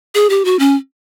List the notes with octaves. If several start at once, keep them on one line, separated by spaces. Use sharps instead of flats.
G#4
G4
F#4
C#4